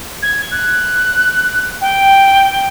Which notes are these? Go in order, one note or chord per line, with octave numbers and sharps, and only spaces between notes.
G#6
F#6
G5